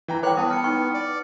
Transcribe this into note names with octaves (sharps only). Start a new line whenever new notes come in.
E3 G5 A#5
B4 C#5 G5 D6 F#6
B3 E4 A5 D#6
F6 C#7
D#4 G5 C#6
D5